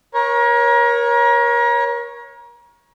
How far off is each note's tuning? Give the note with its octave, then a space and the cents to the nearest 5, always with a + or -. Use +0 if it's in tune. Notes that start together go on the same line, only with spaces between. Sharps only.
A#4 +35 C#5 -10